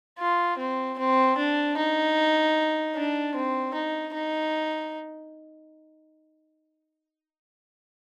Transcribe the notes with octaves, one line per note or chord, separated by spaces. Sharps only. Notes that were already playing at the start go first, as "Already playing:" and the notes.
F4
C4
C4
D4
D#4
D4
C4
D#4
D#4